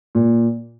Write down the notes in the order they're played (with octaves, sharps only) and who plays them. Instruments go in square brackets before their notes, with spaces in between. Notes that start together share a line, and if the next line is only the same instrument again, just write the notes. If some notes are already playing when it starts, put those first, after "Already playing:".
[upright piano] A#2